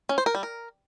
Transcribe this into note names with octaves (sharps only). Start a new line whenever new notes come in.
C#4
C5
A#4
G3
A#4